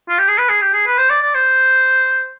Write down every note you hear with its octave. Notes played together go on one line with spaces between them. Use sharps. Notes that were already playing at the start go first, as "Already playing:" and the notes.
F4
G4
G#4
B4
G#4
G4
G#4
B4
C5
D5
D5
C5